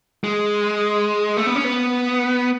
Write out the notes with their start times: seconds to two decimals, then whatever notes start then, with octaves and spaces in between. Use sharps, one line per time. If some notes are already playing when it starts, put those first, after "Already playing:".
0.24 G#3
1.37 A3
1.46 B3
1.56 C#4
1.64 B3